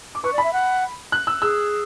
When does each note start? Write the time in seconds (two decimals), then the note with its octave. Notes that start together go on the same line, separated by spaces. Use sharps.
0.15 D6
0.24 B4 C#6
0.33 D5 B5
0.43 E5
0.53 F#5
1.12 F#6
1.27 E6
1.42 G#4 E6